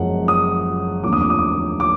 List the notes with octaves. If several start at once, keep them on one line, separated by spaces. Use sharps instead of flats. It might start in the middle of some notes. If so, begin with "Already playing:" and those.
Already playing: F#1 F#2 F3 G#3 F#5
D#6
F1 D#2 D3 F3 D6
D#6
D6
D#6
D6
D6